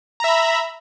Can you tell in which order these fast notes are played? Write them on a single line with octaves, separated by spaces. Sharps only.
A#5 E5 B5